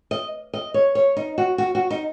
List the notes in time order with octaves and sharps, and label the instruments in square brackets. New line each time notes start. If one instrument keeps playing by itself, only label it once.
[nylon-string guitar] D#5
D#5
C#5
C#5
D#4
F#4
F#4
F#4
D#4